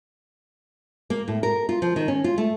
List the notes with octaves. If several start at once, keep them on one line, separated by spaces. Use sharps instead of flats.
A#3
A2
A#4
F4
F3
D#3
C#4
F4
A3